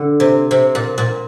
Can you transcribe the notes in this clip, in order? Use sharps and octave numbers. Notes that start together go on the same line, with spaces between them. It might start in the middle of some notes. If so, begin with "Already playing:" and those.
Already playing: D3
C3
C3
A#2
A#2